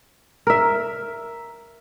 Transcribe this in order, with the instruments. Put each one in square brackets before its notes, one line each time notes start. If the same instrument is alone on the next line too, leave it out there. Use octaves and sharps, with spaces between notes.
[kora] A#4 E5